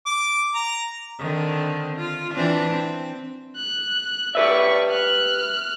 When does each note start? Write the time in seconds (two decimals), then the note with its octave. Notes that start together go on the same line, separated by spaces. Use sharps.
0.06 D6
0.54 A#5
1.19 D3 D#3 C4
1.96 F4
2.35 E3 C4 D4
2.71 C4
3.57 F#6
4.35 G4 B4 D5 E5 C#6
4.91 F6 F#6